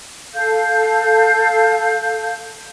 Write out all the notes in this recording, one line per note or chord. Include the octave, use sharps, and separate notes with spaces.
A4 F5 G6